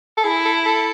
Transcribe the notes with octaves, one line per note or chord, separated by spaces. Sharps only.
A4
E4 G#4
A4
A4